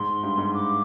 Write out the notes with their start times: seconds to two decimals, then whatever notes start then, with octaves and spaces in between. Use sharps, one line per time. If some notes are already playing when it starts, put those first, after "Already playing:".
Already playing: G#2 C6
0.23 G2
0.38 G#2
0.53 D6